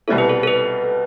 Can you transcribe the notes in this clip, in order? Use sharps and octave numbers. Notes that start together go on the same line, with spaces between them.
C2 B2 G3 C4 E4 A4
B4
A4
A4
B4